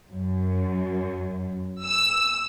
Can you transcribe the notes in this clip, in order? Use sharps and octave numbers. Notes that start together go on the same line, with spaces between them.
F#2
E6